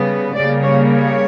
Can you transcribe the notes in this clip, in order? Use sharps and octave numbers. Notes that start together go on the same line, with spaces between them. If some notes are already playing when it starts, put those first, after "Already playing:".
Already playing: C#3 G3 B3
C#3 G3 A#3 D5
C#5
C#5